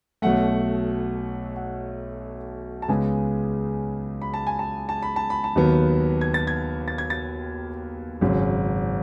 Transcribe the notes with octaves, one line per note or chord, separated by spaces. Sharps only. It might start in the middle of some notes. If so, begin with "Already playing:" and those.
B1 B2 F#3 A3 F#5
F#5
A5
C#2 C#3 G#3 B3 G#5
B5
A5
G#5
A5
A5
B5
A5
B5
A5
D#2 D#3 F#3 B3
G#6
A6
G#6
A6
G#6
A6
G#1 F#2 C#3 F#3